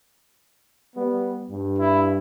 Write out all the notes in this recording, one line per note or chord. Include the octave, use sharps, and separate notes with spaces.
G3 B3
G2
E4